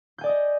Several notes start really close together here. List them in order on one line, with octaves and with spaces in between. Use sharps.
G6 G#5 D5 D#6 D#5